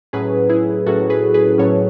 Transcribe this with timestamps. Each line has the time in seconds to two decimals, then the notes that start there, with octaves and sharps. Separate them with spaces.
0.13 A2 F#3 C#4 G#4 B4
0.50 E4 G#4
0.86 A2 F#3 C#4 F#4 A4
1.10 G#4 B4
1.34 G#4 B4
1.58 A2 F#3 C#4 A4 C#5